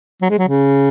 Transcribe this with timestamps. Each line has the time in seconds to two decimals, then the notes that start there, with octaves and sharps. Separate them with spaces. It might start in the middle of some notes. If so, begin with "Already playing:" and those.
0.22 F#3
0.30 G#3
0.39 F#3
0.48 C#3